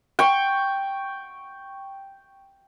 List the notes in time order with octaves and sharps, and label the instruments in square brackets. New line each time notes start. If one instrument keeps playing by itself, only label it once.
[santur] G5 C#6